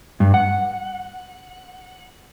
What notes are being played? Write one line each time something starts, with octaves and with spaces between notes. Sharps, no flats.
G2
F#5